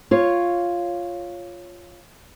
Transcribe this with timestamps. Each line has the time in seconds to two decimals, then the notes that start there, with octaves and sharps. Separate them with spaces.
0.11 F4 C#5